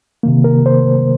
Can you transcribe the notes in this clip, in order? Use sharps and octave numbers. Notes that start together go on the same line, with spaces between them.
C3 D#3 A#3
A#4
C5